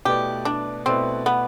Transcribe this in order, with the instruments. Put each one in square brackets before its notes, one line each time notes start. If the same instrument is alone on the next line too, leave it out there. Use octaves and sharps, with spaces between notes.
[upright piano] B2 A3 E4 B4 D5 [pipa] G4
[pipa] D4
[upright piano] B2 A3 E4 B4 D5 [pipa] C4
[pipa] B3